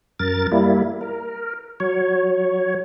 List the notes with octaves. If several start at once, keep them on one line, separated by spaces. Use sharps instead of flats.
F#2 A#4 A6
G3 A#3 E4
A#4
F#3 C#5